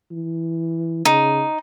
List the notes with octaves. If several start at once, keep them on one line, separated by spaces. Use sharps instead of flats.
E3
C#3 D#4